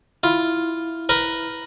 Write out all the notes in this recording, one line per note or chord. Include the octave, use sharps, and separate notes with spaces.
E4 F4
A#4 B4